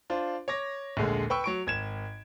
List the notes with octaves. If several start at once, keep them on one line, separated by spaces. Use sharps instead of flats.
D4 F4 C5
C#5 D6 A#6
A#1 D#2 D3 G#3
B4 G5 C#6 E6
F#3 C#6 D7
G#1 G#6 E7